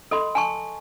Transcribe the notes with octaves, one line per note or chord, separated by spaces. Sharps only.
A4 D#5 B5 C6
G#5 A5 C#6